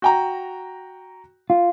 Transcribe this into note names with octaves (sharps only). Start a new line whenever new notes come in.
F#4 G5 A#5
F4